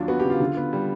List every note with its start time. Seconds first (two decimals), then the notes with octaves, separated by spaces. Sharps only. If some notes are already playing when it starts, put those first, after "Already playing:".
Already playing: D#2 F#3 D4 F4
0.08 B3 F#4
0.20 C#3 G4
0.30 F4
0.40 D3
0.57 B3
0.73 G3